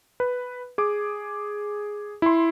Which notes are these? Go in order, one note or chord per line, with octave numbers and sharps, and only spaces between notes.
B4
G#4 D6
E4 C6